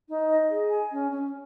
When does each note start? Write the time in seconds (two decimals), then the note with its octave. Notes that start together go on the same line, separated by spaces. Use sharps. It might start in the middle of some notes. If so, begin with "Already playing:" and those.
0.09 D#4
0.29 D#5
0.50 G#4
0.71 G#5
0.91 C#4
1.12 C#4